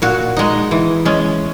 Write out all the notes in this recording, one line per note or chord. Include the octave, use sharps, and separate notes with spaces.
A#2 F#4
G#3 D#4
E3
G#3 C#4